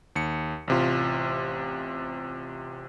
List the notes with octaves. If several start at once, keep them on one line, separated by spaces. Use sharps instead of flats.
D#2 C#7
A1 C3 F4